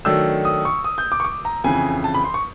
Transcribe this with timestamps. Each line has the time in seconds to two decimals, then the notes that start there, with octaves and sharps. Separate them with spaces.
0.05 D#3 F#3 A3 D4 E6
0.45 D#6
0.65 C#6
0.84 D#6
0.98 G6
1.12 D6
1.20 C#6
1.25 D6
1.45 A#5
1.64 F2 C#3 E3 G#5
2.04 A5
2.14 B5
2.24 C6
2.34 C#6